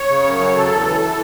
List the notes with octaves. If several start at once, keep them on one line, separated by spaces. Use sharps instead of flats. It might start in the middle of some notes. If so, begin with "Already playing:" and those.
Already playing: C#5
C#3
F#2
F#3
C#3 A4
E2
E3
E3 A4